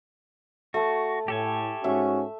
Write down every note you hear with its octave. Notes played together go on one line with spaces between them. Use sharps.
A3 F#4 A5
A2 G4 A4 G#5
G#2 C#4 F#4 E5